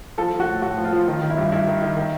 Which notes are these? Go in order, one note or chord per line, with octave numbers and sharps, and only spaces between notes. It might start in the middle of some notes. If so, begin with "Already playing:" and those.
F3 A4
F3
F#4
A2
A2 F#4
F3
F4
F3
D#3 F4
D#3
E4
G2
G2 E4
D#3
D#3
D#3